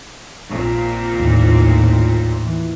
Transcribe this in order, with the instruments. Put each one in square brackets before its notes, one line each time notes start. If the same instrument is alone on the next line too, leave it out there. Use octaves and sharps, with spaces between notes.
[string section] A#1 A#2 C4
[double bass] D#2 A2
E3